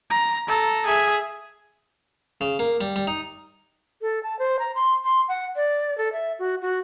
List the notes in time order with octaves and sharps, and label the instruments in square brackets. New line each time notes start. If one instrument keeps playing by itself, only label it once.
[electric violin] A#5
A4 A#5
G#4 E5
[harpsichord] C#3
A#3
G3
G3
D#4
[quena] A4
A5
C5
A#5
C6
C6
F#5
D5
A4
E5
F#4
F#4